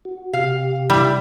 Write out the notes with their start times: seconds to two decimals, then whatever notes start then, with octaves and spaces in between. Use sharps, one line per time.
0.05 F#4
0.33 C3 G4 F5
0.90 G3 E4